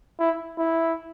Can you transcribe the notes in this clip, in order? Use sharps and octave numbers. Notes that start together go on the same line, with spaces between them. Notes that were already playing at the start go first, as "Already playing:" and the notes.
E4
E4